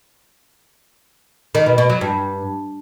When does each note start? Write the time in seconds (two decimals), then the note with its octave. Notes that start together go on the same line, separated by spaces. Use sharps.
1.55 D#3
1.66 B2
1.78 B2
1.90 F#3
2.01 G2